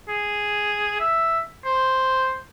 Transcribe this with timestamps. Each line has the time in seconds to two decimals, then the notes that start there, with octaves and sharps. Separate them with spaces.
0.08 G#4
1.00 E5
1.65 C5